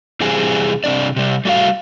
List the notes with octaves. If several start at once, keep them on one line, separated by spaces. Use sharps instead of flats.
C3 E3 G3 C4 G#4 G#5
C3 E3 C4 D4 D5
C3 G3
G3 A3 F#4 C#5 F5